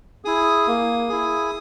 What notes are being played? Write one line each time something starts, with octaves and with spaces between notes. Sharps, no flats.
E4 G#4 D#6
A#3
E4 G#4